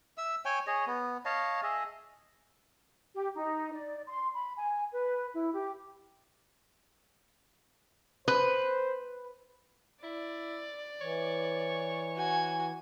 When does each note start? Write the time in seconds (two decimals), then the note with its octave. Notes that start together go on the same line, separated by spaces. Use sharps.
0.18 E5 E6
0.45 C#5 G5 G#5
0.67 G#4 C#5 D#5
0.87 B3
1.25 C#5 D#5 F5 A5
1.63 G#4 D#5 E5
3.15 G4
3.37 D#4
3.73 D5
4.08 C6
4.35 B5
4.57 G#5
4.92 B4
5.34 E4
5.53 G4
8.28 B4 C5
10.04 E4 D5
11.01 E3 C#5
12.16 F#4 G#5